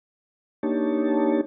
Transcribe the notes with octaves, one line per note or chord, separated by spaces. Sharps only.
A#3 D4 D#4 G4 C#5 A5